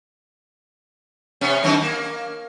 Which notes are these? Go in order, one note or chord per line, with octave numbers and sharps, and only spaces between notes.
C3 B3 C#4
F#2 D#3 C4
A#3